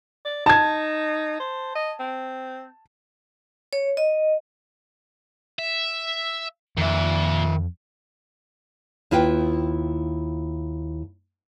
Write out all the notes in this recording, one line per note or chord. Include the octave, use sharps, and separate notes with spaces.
D5
D#4 A5 G#6
C5
D#5
C4
C#5
D#5
E5
F2 A#2 D#3 E5
D#2 E4 F4 B4 G5